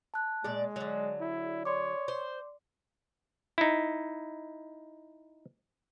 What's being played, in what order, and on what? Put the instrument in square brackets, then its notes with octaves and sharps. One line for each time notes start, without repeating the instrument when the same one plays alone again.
[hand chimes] A5 F#6
[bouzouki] A#2 D5 [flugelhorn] G#3 [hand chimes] G#4
[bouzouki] D3 F#3 [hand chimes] G#4
[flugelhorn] E4
[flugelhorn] C#5 [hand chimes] D5 C6 D6
[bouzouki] C5
[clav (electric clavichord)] D#4 E4